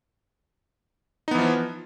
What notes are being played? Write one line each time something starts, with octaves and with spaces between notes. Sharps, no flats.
E3 F3 B3 D#4